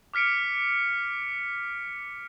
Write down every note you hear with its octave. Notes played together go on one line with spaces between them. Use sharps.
D6 F6 B6 C#7 D7